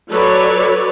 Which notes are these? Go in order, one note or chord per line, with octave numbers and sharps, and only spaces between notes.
F#3 A4 B4 C#5 D5